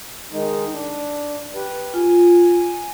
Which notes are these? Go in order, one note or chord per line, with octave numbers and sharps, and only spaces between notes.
D#3 G#3 D#4
D4
G4 B4
F4 G#5